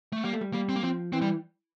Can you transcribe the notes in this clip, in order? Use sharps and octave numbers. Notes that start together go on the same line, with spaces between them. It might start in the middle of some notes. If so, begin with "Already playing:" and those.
A3
G3 A#3
A3
G3
G3 A#3
C4
A#3
F3 C4
E3 C4
G3